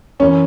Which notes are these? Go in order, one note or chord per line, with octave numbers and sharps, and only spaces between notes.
F#2 E3 C#4